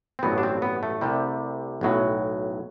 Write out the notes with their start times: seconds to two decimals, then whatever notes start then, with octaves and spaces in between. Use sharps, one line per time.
0.19 C4
0.23 A1 G2 F#3 B3
0.38 D4
0.43 C4
0.62 B3
0.83 A3
1.01 C2 C3 G3
1.81 B1 A2 F#3